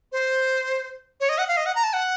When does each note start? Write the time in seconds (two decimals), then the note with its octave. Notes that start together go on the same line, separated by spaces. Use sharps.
0.12 C5
1.20 C#5
1.29 D#5
1.38 F#5
1.48 F5
1.57 D#5
1.66 F#5
1.75 A#5
1.83 A5
1.93 F#5